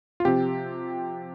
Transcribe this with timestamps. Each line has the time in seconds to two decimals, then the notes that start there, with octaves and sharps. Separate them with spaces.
0.20 F4
0.25 C3 F3 C4 G4